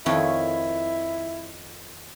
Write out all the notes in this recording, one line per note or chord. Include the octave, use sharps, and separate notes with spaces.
F2 D#3 E4 C#5